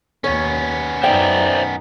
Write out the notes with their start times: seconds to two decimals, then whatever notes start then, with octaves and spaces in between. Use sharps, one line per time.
0.24 D#2 B3 C#4 C#5
1.03 F#2 D#4 C5 D5 E5 G5